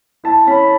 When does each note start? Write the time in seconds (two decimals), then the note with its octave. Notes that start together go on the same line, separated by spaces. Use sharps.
0.24 E4 A5
0.47 C#4 B5